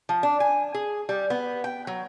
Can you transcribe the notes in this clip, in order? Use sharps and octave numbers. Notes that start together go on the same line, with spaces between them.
F3
D4
G#5
G#4
G3
B3
G5
F#3